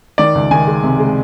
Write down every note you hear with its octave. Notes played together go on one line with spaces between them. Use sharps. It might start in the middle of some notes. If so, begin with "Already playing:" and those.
D#3 D5
C#2
D#3 G#5
G#3
C3
G#3